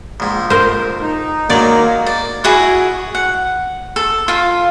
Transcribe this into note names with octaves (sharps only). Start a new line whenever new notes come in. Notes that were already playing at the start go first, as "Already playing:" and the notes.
A#1 G#2
A#4 C5
D#4
F#3 G#3 A#3 D5
D5
E4 F#4 G#4
F#5
A4
F4 F5